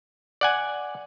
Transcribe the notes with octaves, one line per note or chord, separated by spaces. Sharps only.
D5 F#5 G#5